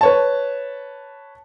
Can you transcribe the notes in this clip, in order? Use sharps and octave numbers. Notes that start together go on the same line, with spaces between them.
B4 C#5 A5